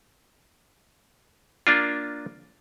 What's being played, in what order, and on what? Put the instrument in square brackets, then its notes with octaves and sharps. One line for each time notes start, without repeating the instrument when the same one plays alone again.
[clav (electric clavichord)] A#3 D4 F4